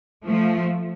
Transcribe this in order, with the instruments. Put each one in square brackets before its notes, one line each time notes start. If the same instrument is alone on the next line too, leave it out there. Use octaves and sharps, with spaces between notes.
[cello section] F3 A3